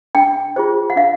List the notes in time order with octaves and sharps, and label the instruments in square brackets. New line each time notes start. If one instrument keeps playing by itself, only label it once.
[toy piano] D4 G5
F4 G#4 C5
F#5
D4 F5